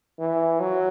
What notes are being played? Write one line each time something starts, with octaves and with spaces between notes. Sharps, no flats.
E3
F#3